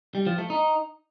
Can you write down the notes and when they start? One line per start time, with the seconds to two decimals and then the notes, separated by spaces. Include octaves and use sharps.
0.15 G3
0.26 F3
0.38 A3
0.50 D#4